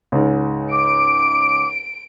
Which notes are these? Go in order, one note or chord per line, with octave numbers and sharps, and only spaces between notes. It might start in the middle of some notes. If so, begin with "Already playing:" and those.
C#2 G#2
D6 D7